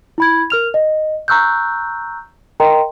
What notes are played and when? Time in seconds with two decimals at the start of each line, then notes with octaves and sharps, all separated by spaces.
0.18 E4 B5 G#6
0.50 A#4 F6 F7
0.74 D#5
1.28 A#5 C#6 E6 F#6 G6
2.60 A#4 D#5 G5 A#5 C6